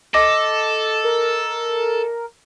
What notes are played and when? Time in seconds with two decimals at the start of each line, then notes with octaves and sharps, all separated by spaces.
0.14 A4 D#5 D6 A#6
1.04 A#4